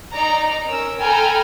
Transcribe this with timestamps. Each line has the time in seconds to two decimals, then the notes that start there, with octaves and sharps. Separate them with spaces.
0.12 D#4 D5 A#5
0.66 C#4 A#4 E6
1.00 A4 G5 G#5 A#5 B5 F6